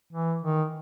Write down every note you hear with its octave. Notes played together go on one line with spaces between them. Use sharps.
E3
D#3